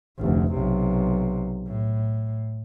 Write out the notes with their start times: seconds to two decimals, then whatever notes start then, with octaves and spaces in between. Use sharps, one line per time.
0.19 F1 D2
0.53 B1 C3
1.67 A2